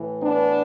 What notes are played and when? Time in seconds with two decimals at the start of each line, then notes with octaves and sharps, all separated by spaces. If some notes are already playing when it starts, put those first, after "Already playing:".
Already playing: A2 E3
0.21 B3 D4